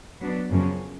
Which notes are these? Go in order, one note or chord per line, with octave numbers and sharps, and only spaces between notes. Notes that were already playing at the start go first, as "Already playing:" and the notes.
F#3 B3 D4
F#2 C#3 F3 A#3 C#4